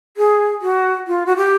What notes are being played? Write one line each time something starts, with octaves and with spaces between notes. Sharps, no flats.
G#4
F#4
F4
F#4
G4